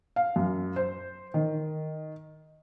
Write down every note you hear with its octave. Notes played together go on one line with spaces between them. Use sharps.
F5
F#2
C5
D#3